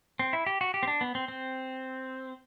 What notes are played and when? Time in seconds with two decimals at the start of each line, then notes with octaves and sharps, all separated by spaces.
0.19 C4
0.33 E4
0.46 G4
0.61 F#4
0.74 G4
0.83 C4
0.88 D4
1.01 B3
1.15 C4
1.28 C4